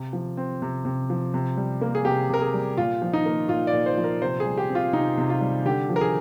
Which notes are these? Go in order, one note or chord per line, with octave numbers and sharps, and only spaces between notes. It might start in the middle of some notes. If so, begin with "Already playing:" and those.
Already playing: C3
F3
C4
C3
C3
F3
C3
G3
A#3
G#4
C3 G4
C3 A#4
G#4
G3
A#2 F4
F3
D#4
A#3
A#2 F4
D5
A#2
C5
F3
A#4
C3 C5
G#4
G3
G4
C4
F4
C3 D#4
C3
F4
G3
D3 G4
F3
A#4
G#4